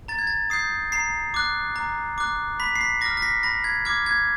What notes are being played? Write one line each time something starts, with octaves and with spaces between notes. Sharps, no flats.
A#5 A6
G#6
A6
D#6 G6 C7
A#5 C7
D6 F#6
A#5
D6 F#6
B5 B6
C7
B6
D6 F6 A#6
A#6
B6
B5 A#6
G#6
D6 F6 G#6
G#6